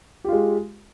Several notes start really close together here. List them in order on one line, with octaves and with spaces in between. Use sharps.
G4 F4 G#3